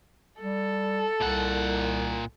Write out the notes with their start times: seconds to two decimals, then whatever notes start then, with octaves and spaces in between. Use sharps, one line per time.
0.41 G3 A4
1.21 C2 A#2 F#5